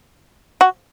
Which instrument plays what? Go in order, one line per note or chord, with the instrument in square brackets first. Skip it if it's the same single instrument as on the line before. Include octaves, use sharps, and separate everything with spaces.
[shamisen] F#4